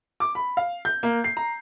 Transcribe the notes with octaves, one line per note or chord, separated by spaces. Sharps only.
D6
B5
F5
G6
A#3
C7
A#5